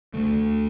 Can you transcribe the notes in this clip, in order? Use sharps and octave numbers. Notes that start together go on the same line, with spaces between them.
D2 D3 A3